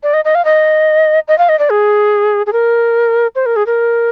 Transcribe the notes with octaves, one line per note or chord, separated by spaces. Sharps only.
D5
D#5
D#5
F5
D#5
D#5
F5
D#5
D5
G#4
G#4
A#4
C5
A#4
G#4
A#4